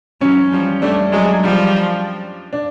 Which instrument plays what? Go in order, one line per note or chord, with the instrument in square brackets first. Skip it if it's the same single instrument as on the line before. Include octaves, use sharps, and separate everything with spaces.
[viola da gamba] E3 F#3 [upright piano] C#4
[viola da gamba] F3 G3
[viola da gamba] G3 A3 [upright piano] D4
[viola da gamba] F#3 G#3
F3 G3
[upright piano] D4